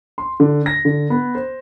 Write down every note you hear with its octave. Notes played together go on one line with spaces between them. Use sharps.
C6
D3
A#6
D3
B3
C5